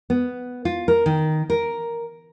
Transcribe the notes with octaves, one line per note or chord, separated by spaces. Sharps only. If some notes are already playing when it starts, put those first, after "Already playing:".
B3
F4
A#4
D#3
A#4